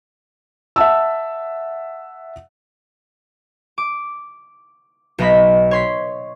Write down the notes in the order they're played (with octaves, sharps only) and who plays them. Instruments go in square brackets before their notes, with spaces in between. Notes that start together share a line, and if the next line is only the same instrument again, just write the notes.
[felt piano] E5 F#5 A5 E6
[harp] D6
B1 B3 D#5 B5 B6
C#5 C6 B6